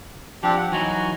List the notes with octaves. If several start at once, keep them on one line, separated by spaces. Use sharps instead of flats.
F3 C4 D4 G4
F#5
E3 F#3 D#4 F#4 G#5